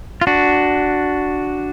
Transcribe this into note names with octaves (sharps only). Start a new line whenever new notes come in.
F4
D4 F#4